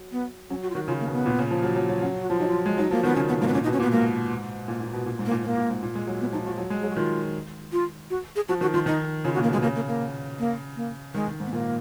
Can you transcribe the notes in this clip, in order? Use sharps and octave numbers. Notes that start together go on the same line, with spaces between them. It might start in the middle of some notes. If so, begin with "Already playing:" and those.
Already playing: F#3
B3
F#3 C#4
F#4
F4
D#3 F#4
C#3 F4
A#3
B2
B3
A#2
C#3
F3
F#3
F#3
F#3
F#3 C#4
F#4
F3 F4
F#3 D#4
F3 F4
G#3
F#3 D#4
F3 A#3
D#3 B3
C#3 C#4
B2 B3
G#2 A#3
B3
A#2 C#4
D#4
B2
C#4
A#2 B3
G#2 A#3
A#2
A#2
B2
A#2
G#2
A#3
A#2
A#2 A#3
A#2
G#2
A#2
G#3
F#3
B3
F3 D#4
F3 F#4
F#3
G#3
F#3 G#4
F#4
D#3 F4
F4
F#4
G#4
F3 F#4
D#3 F#4
D#3 F4
D#3 D#4
C#3 F4
F#4
A#2
A#3
B2 G#3
C#3 A#3
A#3
A#3
A#3
A#3
D#3 G#3
D#3
G#2
B3
A#2 A#3